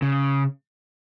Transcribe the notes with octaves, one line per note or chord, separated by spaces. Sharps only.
C#3